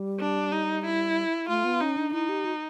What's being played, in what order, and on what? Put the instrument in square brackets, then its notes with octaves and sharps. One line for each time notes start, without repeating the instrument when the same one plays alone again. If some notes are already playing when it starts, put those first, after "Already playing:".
Already playing: [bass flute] G3
[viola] D4
D#4
E4
[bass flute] A3 [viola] F4
[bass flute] B3
[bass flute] C#4 [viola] D#4
[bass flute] D4
[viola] D#4 [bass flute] E4
[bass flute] G4
F#4